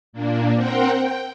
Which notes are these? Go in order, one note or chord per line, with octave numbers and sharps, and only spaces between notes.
A#2 A#3 D4
C4 A#4 C5 F#5 G5
G5